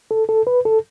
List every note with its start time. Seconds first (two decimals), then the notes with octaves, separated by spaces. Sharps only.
0.11 A4
0.29 A4
0.47 B4
0.65 A4